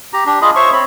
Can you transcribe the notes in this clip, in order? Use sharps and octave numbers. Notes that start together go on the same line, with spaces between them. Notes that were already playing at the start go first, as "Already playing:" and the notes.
G4 A#5
D4 G4
F4 G#4 D#5 B5
C5 C#5 E5 C#6
C4 C#5 B5